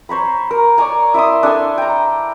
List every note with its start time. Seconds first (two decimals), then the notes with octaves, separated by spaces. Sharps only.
0.09 C5 C#5 A#5 B5
0.51 A#4
0.78 C#5 D5 G#5 A#5
1.14 E4 E5 C6 D#6
1.43 D4 A4 G#5 C6
1.78 G5 A#5